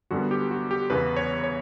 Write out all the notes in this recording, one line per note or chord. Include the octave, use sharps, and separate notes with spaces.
F#2 D3 G3 B3 F#4
G4
F#4
G4
E2 C#3 E3 B3 B4
C#5
C#5